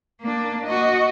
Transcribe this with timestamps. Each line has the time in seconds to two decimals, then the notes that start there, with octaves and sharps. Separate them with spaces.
0.21 A#3 D4
0.66 F#4 D#5